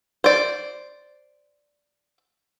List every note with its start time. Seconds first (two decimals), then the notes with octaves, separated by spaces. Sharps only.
0.24 C5 D5